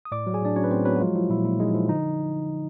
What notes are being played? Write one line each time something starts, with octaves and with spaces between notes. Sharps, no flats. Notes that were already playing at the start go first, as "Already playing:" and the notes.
D#6
A2 D5 D6
F#3
G#4 G#5
A2 D4 D5
F#3 C#4 C#5
B4
A2 C4 C5
F#3 B3 B4
F#4
F3 G#3 F4
F3 E4
A#2 E4
A#2 E4
G#3 D#4
F3 E4
D3 D#4